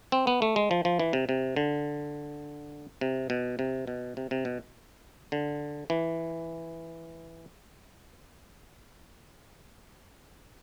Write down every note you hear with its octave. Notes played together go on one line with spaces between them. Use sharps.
C4
B3
A3
G#3
F3
F3
E3
C3
C3
D3
C3
B2
C3
B2
C3
C3
B2
D3
E3